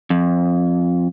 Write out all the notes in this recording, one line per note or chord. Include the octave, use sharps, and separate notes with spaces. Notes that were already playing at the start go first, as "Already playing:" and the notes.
F2